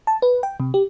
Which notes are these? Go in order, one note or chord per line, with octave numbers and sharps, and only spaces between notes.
A5
B4
G5
C3
G4